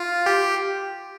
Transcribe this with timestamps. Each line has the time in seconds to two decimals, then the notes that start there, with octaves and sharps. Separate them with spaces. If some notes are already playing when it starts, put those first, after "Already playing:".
Already playing: F4
0.26 G4